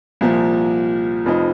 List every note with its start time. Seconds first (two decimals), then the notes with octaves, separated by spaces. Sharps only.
0.21 C2 A#2 F3
1.25 F1 F2 F3 D#4